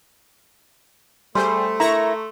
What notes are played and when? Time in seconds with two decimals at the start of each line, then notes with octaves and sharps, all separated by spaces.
1.35 G3 A3 G#4 C5 C6
1.80 E4 A#4 A#5 C#6 A#6